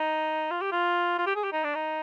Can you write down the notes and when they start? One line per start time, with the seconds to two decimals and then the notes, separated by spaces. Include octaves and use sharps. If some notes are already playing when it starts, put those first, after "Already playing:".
Already playing: D#4
0.51 F4
0.61 G4
0.72 F4
1.18 F4
1.27 G4
1.36 G#4
1.44 G4
1.52 D#4
1.64 D4
1.75 D#4